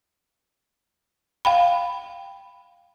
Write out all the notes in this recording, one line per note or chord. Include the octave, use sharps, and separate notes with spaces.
F5 G5 B5